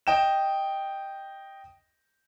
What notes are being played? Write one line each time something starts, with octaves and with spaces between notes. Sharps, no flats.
D#5 G5 E7